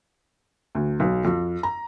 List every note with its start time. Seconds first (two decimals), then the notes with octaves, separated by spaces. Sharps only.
0.75 D2
1.00 B1
1.25 F2
1.63 A#5